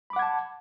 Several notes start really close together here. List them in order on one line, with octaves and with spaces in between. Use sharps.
B5 D6 F#5 G#6 A5